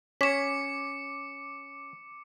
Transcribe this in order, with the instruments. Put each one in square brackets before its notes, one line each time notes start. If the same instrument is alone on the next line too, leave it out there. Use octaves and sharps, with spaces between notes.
[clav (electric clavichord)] C#4 [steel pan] C#5 [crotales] D6 C#7 [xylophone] B6 E7